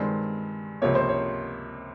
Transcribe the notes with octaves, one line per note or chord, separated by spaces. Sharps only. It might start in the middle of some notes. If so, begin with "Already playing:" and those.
Already playing: G2 D#3 G#3 C4
C#2 C3 F3 A#3 C#5
C5
C#5